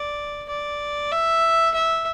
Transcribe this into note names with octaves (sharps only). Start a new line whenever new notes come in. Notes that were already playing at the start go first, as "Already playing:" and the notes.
Already playing: D5
D5
E5
E5